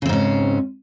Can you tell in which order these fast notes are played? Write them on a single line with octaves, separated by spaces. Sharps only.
C#3 C4 G#2 C#4